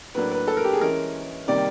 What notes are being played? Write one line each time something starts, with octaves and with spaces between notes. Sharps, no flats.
A2 F#3 A#3 D4 B4
B4
A4
A#4
G4
G#4
E3 G#3 C#4 A#4
C3 D#3 G3 A#3 D5